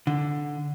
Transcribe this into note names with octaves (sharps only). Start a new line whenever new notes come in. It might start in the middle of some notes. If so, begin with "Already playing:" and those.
D3